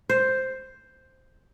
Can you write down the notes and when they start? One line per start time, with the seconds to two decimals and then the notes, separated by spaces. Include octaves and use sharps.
0.09 C5